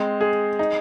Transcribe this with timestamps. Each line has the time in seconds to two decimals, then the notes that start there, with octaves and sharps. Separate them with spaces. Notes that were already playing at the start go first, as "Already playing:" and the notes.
Already playing: G#3 C4
0.21 G#4
0.59 D#4